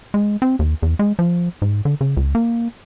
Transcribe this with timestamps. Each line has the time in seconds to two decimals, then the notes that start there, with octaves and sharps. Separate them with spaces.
0.14 G#3
0.42 C4
0.59 D#2
0.82 E2
0.99 G#3
1.19 F3
1.62 G#2
1.85 D3
2.01 C#3
2.17 C#2
2.35 A#3